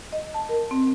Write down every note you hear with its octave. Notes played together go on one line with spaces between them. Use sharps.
D#5
A5
A#4
C4